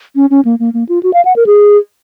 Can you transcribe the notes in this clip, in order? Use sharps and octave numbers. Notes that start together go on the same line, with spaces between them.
C#4
C#4
A#3
A#3
A#3
F4
F#4
F5
F#5
A#4
G#4